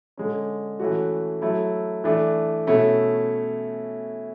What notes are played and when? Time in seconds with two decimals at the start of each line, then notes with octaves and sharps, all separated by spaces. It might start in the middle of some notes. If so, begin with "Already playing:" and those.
0.17 D3 G#3 C#4
0.80 E3 A3 C#4 F#4
1.42 F#3 A3 E4
2.04 E3 A3 D4
2.67 B2 A3 C#4 E4